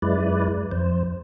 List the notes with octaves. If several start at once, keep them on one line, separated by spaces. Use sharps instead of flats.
F#2 G#3 E4 B4 D5
F2 C5